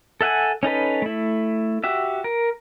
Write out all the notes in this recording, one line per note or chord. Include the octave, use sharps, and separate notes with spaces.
A4 E5 F#5 G#5
C#4 D#4 A4 B4
A3 E4
F#4 G4 E5
A#4